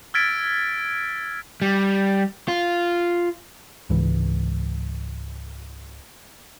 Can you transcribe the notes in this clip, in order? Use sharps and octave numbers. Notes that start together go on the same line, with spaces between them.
E6 F6 G#6 A6 B6 D7
G3
F4
C#2 G#2 E3